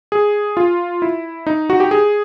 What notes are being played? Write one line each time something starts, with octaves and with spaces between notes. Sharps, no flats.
G#4
F4
E4
D#4
F#4
G4
G#4